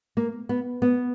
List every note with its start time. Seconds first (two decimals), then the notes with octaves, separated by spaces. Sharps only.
0.17 A#3
0.49 B3
0.82 B3